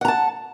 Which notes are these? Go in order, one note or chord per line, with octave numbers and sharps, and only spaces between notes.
F#5 A5 A#5